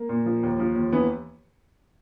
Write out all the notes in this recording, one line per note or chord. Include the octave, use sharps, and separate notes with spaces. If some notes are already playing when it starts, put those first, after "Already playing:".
Already playing: A#3
A#2
F3
D#2
F3
D#2
E3 B3